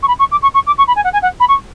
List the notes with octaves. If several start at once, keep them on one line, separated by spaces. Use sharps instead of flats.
C#6
B5
C#6
D6
C#6
C#6
D6
C#6
B5
G#5
F#5
G#5
F#5
B5
C#6